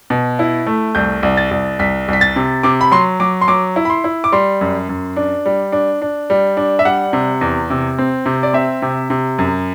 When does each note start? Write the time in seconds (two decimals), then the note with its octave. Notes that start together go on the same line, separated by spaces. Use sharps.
0.10 B2
0.39 E4
0.66 A3
0.95 C2 G6
1.23 C2
1.37 A6
1.51 C2
1.79 C2 B6
2.08 C2
2.13 B6
2.21 A6
2.36 C3
2.63 C3 D6
2.81 B5
2.92 F#3 C6
3.20 F#3 D6
3.41 C6
3.48 F#3 D6
3.76 E4
3.85 B5
3.90 C6
4.04 E4
4.24 D6
4.32 G3 C6
4.61 F#2
4.89 F#2
5.16 D4
5.46 G3
5.72 D4
6.02 D4
6.30 G3
6.57 D4
6.79 E5
6.85 G3 F#5
7.13 C3
7.41 E2
7.70 C3
7.98 C4
8.26 C3
8.43 D5
8.54 C4 E5
8.82 C3
9.10 C3
9.39 F#2